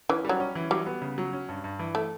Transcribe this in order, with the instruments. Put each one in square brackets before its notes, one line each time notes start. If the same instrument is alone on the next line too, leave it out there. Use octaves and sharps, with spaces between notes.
[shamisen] E3 [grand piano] C#4
[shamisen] F#3 [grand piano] G3
[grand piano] C#4
E3
[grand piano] F#3 [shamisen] G3
[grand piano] B3
C#3
F#3
C#4
G2
G2
E3
[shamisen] A3